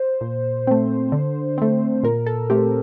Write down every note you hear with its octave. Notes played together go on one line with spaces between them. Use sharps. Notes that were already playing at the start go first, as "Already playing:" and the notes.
Already playing: C5
A#2
A3 C4
D3
A3 C4
A#2 A#4
A4
A3 C4 G4